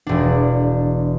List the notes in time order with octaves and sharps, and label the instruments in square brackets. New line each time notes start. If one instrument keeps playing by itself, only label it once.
[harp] E1 D4